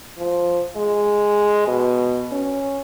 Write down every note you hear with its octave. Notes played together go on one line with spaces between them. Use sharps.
F3
G#3
B2
C#4